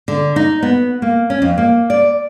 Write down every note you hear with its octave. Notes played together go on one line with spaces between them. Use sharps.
D3
D#4
B3
A#3
C#4
F2
A#3
D5